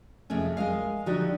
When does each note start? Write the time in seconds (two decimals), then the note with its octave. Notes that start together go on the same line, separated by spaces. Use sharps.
0.30 F2 C3 G#3 A3 C#4
0.57 G#3 A#4 D#5 F5
1.06 D3 F3 D#4 F#4 G4